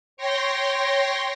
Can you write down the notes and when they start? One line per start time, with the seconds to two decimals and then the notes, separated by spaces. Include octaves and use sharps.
0.17 C#5 G5 C6 A#6